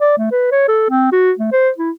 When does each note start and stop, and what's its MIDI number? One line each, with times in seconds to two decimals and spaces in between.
0.01 0.17 74
0.18 0.30 57
0.31 0.51 71
0.52 0.67 73
0.68 0.87 69
0.90 1.11 60
1.12 1.32 66
1.39 1.51 57
1.52 1.70 72
1.78 1.91 64